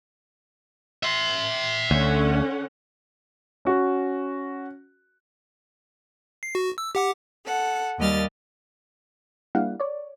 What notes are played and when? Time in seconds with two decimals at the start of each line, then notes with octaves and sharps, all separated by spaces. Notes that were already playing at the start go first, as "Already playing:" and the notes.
1.03 E5 C6
1.91 D2 D3 C#4 F#5
3.65 C#4 F#4
6.43 C7
6.55 F#4
6.78 E6
6.95 G4 F#5 D6
7.46 A4 F#5
7.98 D#2 G3 D#5 F6 A6
9.55 G3 A#3 D4 E4 F5 F#5
9.80 C#5 D5